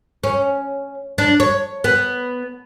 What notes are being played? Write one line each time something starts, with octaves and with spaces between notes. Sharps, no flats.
C#4
D4
C#5
B3